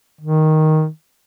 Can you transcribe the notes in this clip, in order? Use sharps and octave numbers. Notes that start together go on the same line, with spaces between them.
D#3